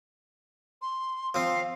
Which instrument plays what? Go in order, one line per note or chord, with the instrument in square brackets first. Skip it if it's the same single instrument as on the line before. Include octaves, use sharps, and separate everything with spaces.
[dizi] C6
[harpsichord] F3 C4 [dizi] F5